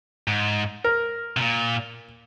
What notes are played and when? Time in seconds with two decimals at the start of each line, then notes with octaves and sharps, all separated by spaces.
0.28 G#2
0.84 A#4
1.37 C3
1.41 A#2